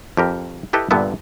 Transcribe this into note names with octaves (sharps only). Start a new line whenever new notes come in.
F2 G4 A#4
E4 G4 A4 B4 D#5
G2 A#2 D3 B3 E5